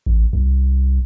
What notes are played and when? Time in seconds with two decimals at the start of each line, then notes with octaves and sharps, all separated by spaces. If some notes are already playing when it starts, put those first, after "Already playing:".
0.06 A1
0.33 C2